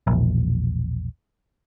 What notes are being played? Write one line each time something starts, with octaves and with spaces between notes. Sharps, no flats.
E1 A#1